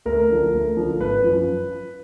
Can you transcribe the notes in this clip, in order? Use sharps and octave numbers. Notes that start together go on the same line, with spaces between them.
D2 A#4
D3 F3
D2
D3 F3
G#1 B4
F#2 F3